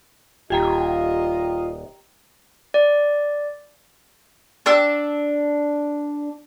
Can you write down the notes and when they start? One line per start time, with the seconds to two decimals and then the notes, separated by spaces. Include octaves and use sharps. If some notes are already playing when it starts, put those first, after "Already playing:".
0.50 D#1 F4 G4 D#5 G5 A#5
2.74 D5
4.66 D4 A5 E6